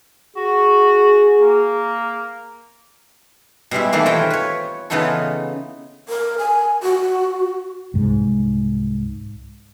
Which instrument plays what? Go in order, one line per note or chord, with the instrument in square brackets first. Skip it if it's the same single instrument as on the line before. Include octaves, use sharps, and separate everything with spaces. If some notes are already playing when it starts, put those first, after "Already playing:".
[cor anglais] F#4 [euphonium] G#4
[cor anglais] A#3
[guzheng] B2 G3 G#3 E4
D#3 E3 A3 A#3
C4 F4 B4 C#5 G5 A#5
B4 C#5
C#3 E3 B3 D#4 F4 A4
[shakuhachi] A#4
G#5
F#4
[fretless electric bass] C2 G#2